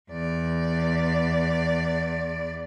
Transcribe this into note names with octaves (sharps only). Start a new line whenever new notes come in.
E2 D5